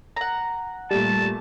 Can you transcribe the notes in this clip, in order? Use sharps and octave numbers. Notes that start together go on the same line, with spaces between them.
F#5 A#5
A#2 G3 A3 A5